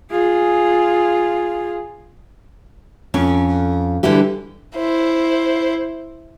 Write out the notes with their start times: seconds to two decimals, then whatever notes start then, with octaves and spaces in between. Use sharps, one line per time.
0.11 F4 G#4
3.14 F2 C#4
4.03 D3 E3 G3 E4 G4
4.76 E4 C5